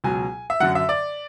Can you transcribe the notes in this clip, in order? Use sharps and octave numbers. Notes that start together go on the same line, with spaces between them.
C#2 B2 F#3 G#5
E5
F#2 D3 F#3 F#5
E5
D5